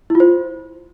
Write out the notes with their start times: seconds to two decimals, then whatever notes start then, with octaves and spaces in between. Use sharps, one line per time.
0.10 E4
0.15 F4
0.20 C5